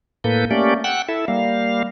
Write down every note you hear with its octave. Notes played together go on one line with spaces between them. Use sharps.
A2 A#3 A4 B4 G6
A3 A#3 C#4 G4 D5
F#5 G5 E6 F#6
E4 A4 E5
G3 A#3 F5